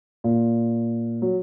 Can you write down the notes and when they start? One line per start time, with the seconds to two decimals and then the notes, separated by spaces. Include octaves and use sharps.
0.24 A#2
1.22 F#3